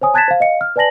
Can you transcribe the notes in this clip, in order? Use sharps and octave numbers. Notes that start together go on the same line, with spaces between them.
C5 C#5 G#5 D#6
A5 F#6 G#6 A6 B6 E7
C5 F5
D#5 F5 C#7
F6
B4 D5 G#5 A5 A#6 F#7